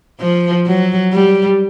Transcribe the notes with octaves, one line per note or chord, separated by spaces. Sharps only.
F3
F#3
G3